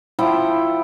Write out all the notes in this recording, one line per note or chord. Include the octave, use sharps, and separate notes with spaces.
F3 E4 F#5 G5